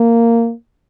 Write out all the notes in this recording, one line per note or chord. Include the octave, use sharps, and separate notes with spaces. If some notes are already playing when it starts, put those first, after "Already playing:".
Already playing: A#3